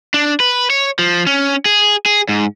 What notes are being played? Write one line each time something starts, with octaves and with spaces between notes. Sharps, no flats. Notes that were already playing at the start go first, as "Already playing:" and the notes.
D4
B4
C#5
F3
C#4
G#4
G#4
G#2